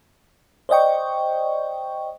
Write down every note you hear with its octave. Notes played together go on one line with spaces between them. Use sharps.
C5 D5 D#5 G5 C#6